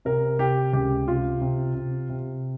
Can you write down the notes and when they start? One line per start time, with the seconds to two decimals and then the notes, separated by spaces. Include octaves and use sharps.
0.05 C3 A#4
0.39 C3 G4
0.73 C#2 G4
1.07 C3 F4
1.41 C3
1.75 C3
2.09 C3